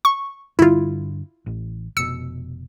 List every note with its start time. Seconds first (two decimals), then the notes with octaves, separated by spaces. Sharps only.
0.05 C#6
0.59 G2 D3 G3 E4 F4
1.46 A1
1.97 F1 B2 E6 C#7